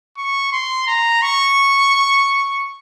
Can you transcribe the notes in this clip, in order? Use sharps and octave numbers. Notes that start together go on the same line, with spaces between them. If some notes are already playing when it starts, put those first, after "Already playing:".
C#6
C6
A#5
C#6